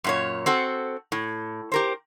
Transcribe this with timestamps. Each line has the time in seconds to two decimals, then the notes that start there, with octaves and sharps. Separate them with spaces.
0.04 F#2 A#2 C#5
0.46 C4 F#4 A4
1.12 A2
1.72 G4 A#4 C5